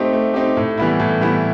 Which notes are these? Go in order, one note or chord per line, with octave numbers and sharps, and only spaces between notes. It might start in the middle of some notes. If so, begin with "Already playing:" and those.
Already playing: A3 C4 D#4 G4
A3
C4 D#4 G4
A2
E3 G3 B3 E4
A2
E3 G3 B3 E4